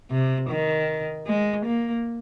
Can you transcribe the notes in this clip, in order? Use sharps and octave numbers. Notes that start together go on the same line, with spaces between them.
C3
D#3
G#3
A#3